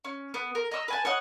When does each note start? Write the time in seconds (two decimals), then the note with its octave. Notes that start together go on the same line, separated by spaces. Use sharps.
0.05 C#4
0.34 B3
0.55 A#4
0.71 D#5 A#5 C#6 E6
0.88 B4 G#5 A5
1.05 C#5 D#5 F#5